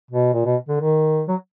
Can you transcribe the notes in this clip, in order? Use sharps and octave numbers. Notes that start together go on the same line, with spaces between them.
B2
A#2
B2
D3
D#3
F#3